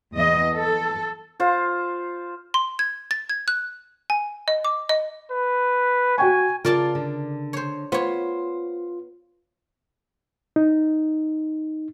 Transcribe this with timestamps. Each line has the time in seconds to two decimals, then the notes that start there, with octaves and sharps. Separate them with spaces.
0.14 E2 D#5
0.54 A4
1.40 F4 C5
2.54 C6
2.79 G#6
3.11 A6
3.30 G#6
3.48 F#6
4.10 G#5
4.48 D#5
4.65 D6
4.89 D#5
5.31 B4
6.18 F#4 G5 G#5 C#6
6.65 C#3 F4 A#4 D5 A5
6.95 D3
7.53 C5 C#5
7.92 B3 F4 C5 C#5
10.56 D#4